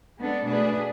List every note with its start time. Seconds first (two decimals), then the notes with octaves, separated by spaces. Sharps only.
0.19 G#3 B3 D4 A4
0.46 B2 A3 D4 G#4 B4